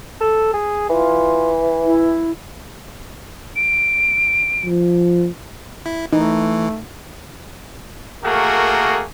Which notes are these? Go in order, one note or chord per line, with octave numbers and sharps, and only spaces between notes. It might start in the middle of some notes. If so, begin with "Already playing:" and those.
A4
G#4
E3 F4
E4
D7
F3
E4
E3 A3 D#4
A3 A#3 F#4 G#4 A#4